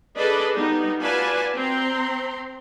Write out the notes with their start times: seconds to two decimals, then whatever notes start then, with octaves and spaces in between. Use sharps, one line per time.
0.17 D4 G#4 A4 B4 D5 D#5
0.56 G3 B3 D#4
1.01 F4 F#4 B4 D5 G#5 A5
1.55 C4 A#5 C6